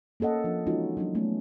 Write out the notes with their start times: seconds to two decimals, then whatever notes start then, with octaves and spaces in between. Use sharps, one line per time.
0.20 A#3 C#4 A4 D#5 F#5
0.44 F3 D4
0.66 E3 G#3 C#4 D#4 F4 F#4
0.97 F#3 C#4 D4
1.15 A3 B3 C#4